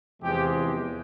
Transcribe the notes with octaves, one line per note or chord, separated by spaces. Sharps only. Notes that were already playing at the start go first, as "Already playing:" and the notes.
E2 C3 F3 G#3 G4